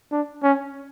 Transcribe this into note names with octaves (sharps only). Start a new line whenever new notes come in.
D4
C#4